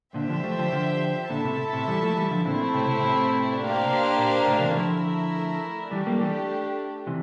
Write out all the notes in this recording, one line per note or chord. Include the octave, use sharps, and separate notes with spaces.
A#2 D3 G4 C5 E5 G5
D3 F3
F3 A3
D3 F3
D3 F3
A#2 D3 E4 A4 E5 A5
A2 C3
A2 C3
E3 G3
F3 A3
E3 G3
D3 F3
A#2 D3 A3 C4 E4
A2 C3
A2 C3
A2 C3
A#3 D4 G4 C5 F5
A#2
A2 C3
C3 E3
D3 F3 A3 E4 A#4 E5
E3 G3 A3 D4 G4
G3 A#3
E3 G3
C3 E3